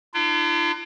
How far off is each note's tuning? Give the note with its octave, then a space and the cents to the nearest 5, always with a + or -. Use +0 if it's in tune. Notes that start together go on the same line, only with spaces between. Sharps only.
D4 +45 F4 -45